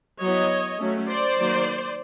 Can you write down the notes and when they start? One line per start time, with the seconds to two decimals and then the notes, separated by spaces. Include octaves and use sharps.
0.21 F#3 B3 E4 C#5 D#5
0.79 F#3 A3 C#4
1.08 C5 D5
1.38 D#3 F#3 A#3